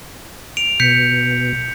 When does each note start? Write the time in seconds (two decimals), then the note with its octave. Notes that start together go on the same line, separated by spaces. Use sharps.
0.57 D7 F7
0.80 B2 G6 B6 C#7